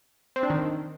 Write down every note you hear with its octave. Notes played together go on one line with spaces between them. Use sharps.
C4
D4
D#3